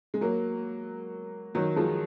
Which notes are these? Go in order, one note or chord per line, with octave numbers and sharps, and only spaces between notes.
G#3
F#3 A#3
D#3 F#3
F3 G#3